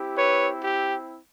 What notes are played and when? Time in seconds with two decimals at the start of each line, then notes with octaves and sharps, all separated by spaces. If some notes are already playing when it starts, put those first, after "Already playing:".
Already playing: C4 E4 G4
0.16 B4 C#5
0.62 G4